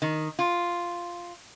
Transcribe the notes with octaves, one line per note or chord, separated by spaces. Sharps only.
D#3
F4